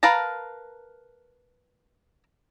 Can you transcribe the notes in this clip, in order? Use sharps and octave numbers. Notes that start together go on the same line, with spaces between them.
A#4 B4 F5 A5 A#5